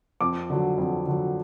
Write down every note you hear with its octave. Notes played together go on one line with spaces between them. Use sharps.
F2 D6
D3 F#3
F2
D3 F#3